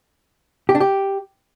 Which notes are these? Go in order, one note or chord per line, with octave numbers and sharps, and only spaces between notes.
G4
D4
G4